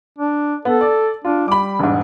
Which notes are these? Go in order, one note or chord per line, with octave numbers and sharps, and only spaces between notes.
D4
B3 A4
D5
D4 F4
G3 B5 D6
E1 G#2